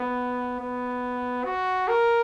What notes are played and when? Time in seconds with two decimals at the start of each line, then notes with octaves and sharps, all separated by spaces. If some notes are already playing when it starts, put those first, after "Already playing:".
Already playing: B3
0.60 B3
1.45 F#4
1.88 A#4